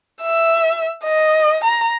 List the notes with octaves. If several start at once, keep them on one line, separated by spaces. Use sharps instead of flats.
E5
D#5
A#5